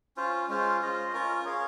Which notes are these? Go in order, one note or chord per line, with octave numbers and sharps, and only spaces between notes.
C#4 F4 C5
G#3 C#4 F4 C5
F4 C5 D#5
C#4 F4 A#4
C#4 G#4 C#5 F5